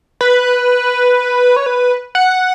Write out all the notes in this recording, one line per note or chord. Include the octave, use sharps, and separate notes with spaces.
B4
C#5
B4
F#5